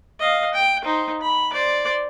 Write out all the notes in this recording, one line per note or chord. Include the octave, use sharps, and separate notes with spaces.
D#5 F5
G5
D#4 C5
B5
C5 D5